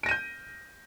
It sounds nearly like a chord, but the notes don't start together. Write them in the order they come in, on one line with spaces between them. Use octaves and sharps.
D7 A#6 D#7 G6